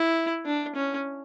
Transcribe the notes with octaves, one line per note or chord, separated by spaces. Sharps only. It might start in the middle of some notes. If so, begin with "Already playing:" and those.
Already playing: E4
D4
C#4